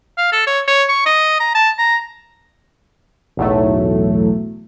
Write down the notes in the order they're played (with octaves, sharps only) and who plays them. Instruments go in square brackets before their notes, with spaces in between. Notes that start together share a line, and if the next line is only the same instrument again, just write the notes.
[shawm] F5
A4
C#5
C#5
C#6
D#5
A#5
A5
A#5
[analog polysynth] B1 E2 A2 F#3 A3